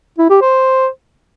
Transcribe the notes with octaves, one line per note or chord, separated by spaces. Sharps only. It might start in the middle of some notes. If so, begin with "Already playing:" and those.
E4
G4
C5